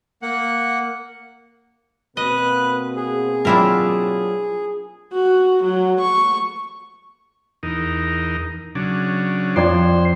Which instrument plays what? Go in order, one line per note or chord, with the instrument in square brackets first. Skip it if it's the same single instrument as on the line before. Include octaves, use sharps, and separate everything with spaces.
[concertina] A#3 F#5
[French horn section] B2 A#3 C4 [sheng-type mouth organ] B4 F#6 [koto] D#5
[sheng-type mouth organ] G#4
[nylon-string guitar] F#3 F4 G5 [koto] D4 E4 A#4
[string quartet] F#4
F#3
C#6
[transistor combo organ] E2 D#4 A#4
C#3 F#3 D4
[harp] F2 D5 G#6 [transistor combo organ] C5 C6